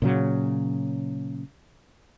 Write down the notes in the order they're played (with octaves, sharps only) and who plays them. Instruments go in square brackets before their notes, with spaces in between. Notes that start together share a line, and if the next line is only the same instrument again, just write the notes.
[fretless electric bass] A#2 C#3 F#3